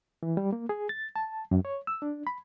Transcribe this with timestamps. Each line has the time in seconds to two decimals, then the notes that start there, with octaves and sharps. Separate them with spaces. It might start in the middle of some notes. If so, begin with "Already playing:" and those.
0.23 E3
0.37 G3
0.53 A#3
0.69 G#4
0.89 A6
1.16 A5
1.51 F#2
1.65 C#5
1.87 E6
2.02 D4
2.27 B5